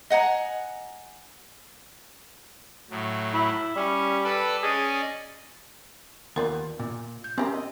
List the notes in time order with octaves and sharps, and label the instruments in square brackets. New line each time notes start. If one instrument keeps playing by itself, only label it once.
[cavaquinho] D#5 F#5 G#5 A#5
[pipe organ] A2 F#3
[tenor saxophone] E4
[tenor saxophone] G3 [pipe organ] C#4
[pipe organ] A4 B4 D5
[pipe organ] C#4 D5 D#5 [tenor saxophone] G#4
[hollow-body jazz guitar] D#2 [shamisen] B3 F4 D5 [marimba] A#4
[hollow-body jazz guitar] A#2
[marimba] G6
[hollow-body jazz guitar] C4 [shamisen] C#4 G4 A#4
[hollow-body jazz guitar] D#5